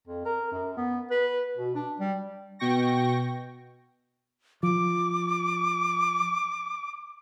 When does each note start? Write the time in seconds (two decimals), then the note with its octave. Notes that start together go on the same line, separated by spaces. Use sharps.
0.07 F2
0.25 A#4
0.51 F#2
0.77 B3
1.11 B4
1.57 B2
1.75 D4
2.00 G3
2.59 B2 G5 C#6 A#6
4.63 F3 D6